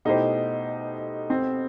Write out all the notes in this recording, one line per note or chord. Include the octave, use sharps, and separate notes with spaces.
B2 A3 D#4 E4 G4 C5
C4